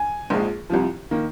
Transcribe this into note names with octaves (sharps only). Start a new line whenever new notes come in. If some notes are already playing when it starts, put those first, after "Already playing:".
Already playing: G#5
A#1 G#2 F3 G#3
C2 C3 F3
D#3 A#3